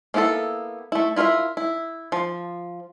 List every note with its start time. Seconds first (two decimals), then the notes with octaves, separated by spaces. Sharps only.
0.14 A#3 B3 E4 F#4 A4
0.92 A3 E4
1.16 E4 F4 A#4 D#5 E5
1.57 E4
2.12 F3